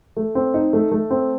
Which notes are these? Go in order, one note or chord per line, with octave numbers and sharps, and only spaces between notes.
A3
C4
D#4
A3
A3
C4